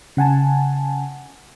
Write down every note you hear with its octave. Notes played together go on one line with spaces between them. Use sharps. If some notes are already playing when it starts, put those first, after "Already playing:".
C#3 F#5 G#5 A5